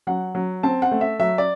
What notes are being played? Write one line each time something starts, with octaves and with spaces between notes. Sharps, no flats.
F#3 F#5
F#3
C4 A5
F#5
A3
E5
F#3 E5
D5